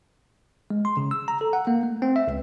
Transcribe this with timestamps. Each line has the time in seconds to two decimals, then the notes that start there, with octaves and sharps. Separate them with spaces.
0.70 G#3
0.85 C6
0.97 C#3
1.11 E6
1.28 A#5
1.41 A4
1.53 F#5
1.67 A#3
1.83 A3
2.02 C4
2.16 E5
2.28 C#2